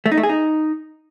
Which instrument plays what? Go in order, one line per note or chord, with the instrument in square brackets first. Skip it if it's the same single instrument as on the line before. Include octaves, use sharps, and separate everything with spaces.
[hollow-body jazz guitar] A3
D#4
A3
G#4
D#4